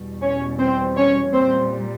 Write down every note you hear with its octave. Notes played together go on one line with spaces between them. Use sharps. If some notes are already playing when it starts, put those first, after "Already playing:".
Already playing: E2 B2 G3
C#4 C#5
C4 C5
C#4 C#5
A#2 G3 C4 C5